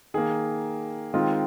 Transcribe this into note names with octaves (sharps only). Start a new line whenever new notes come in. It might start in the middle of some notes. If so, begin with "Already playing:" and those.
D#3 A#3 G#4
D#3 G#3 C4 F4